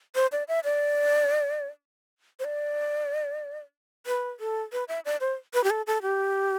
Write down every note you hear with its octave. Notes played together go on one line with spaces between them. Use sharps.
C5
D5
E5
D5
C5
D5
B4
A4
B4
E5
D5
C5
B4
G4
A4
A4
G4